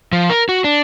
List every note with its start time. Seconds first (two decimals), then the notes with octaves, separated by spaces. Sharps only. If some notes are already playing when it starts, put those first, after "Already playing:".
0.12 F3
0.30 A#4
0.49 F#4
0.64 D4